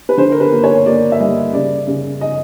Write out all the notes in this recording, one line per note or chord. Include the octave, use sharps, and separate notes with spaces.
B4
D3 C5
A#4
B4
A#3
C#5
A#3 D5
E5
G3 D#5
C#3 D5
C#3
D#5